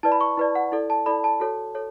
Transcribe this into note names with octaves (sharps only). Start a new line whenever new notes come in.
E4 B4 D5 A5
B5
C#6
E4 B4 D5
F#5
E4 A4 D5
A5
E4 A4 D5 B5
A5
F#4 A4 C#5
A4 C#5